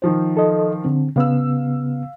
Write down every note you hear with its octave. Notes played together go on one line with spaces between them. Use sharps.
D#3 F3 C5
A4 D#5
D3 C4
C#3 B3 F5 E6